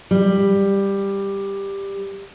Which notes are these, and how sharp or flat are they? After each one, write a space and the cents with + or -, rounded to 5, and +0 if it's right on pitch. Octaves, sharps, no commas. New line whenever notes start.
G3 +10